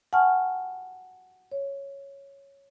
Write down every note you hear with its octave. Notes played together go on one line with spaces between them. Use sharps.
F#5 G#5 A5 C#6 F6
C#5